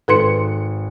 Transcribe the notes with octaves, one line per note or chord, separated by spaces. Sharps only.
G#1 A4 B4 C6 C#7